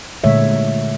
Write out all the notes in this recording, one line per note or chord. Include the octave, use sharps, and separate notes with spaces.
A#2 D3 G#3 A3 C#5 E5